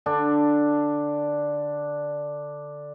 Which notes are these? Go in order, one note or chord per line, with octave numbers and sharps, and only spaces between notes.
D3 D4